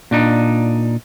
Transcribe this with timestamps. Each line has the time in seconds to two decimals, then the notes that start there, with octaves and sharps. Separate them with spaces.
0.11 A#2 D4 D#4